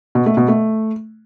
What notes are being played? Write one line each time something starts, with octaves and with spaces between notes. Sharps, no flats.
B2
A3
B2
A3